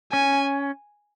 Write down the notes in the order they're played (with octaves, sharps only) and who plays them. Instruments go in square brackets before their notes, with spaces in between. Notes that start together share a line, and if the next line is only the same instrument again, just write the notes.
[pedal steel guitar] C#4 [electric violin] G#5